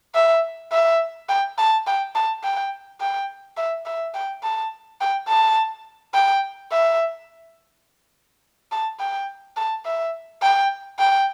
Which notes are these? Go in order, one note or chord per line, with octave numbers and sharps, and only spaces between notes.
E5
E5
G5
A5
G5
A5
G5
G5
E5
E5
G5
A5
G5
A5
G5
E5
A5
G5
A5
E5
G5
G5